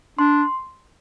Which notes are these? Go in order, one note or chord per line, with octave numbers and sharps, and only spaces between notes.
D4 C6